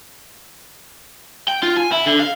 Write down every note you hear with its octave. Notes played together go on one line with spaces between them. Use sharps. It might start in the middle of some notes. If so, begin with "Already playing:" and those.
G5
F4
G#5
E4
D3
F5